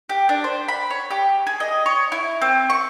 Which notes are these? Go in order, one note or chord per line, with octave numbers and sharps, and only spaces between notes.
G4
D4
C5
B5
C#5
G4
G#4
D#5
C#5
E4
C4
C#6